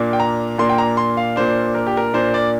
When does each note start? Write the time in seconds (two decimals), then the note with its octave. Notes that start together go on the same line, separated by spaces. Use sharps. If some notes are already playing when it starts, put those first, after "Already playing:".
Already playing: A#2 A#3 D4
0.13 G5
0.20 A#5
0.58 A#2 A#3 D4 C6
0.69 G5
0.78 A#5
0.97 C6
1.17 F5
1.36 A#2 A#3 D4 C5
1.75 A#4
1.87 G4
1.97 A#4
2.14 A#2 A#3 D4 C5
2.34 D5